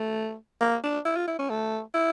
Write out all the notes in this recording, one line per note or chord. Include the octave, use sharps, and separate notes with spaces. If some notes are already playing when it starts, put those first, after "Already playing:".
Already playing: A3
A#3
D4
E4
F4
E4
C#4
A3
E4